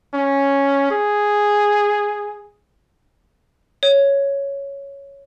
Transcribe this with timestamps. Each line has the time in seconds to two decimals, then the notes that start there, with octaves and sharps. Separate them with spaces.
0.15 C#4
0.91 G#4
3.83 C#5